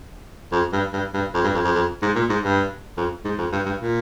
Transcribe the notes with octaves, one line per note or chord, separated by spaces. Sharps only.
F2
G2
G2
G2
F2
G2
F2
F2
F2
G#2
A#2
G#2
G2
F2
G#2
F2
G2
G2
A#2